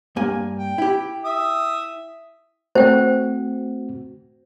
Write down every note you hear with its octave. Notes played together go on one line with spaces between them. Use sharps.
G2 A#3 G#5
G5
E4 G4
E5 D#6
A3 C4 F#4 C5 G5